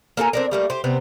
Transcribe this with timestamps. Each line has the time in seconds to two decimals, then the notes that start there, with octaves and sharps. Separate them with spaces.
0.17 A#3 A4 A#4 G#5
0.33 C4 D4 A#4
0.51 G3 A3 A#3
0.70 G4 C5
0.84 C3 B3 C4